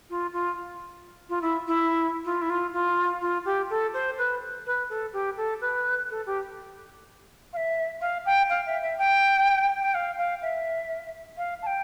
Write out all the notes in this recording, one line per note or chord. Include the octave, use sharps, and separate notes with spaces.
F4
F4
F4
E4
E4
F4
E4
F4
F4
F4
G4
A4
C5
B4
B4
A4
G4
A4
B4
A4
G4
F5
E5
F5
G5
F5
E5
E5
G5
G5
F5
F5
E5
F5
A5
G5